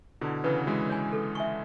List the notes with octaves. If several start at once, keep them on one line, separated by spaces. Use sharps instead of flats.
B2 D3 E4
C#3 E3 B4 F#5
E3 G#3 F#4
C#5 G#5
A4
E5 G#5 C#6